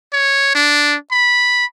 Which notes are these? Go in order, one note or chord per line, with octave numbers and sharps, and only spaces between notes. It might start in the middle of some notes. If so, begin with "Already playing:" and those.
C#5
D4
B5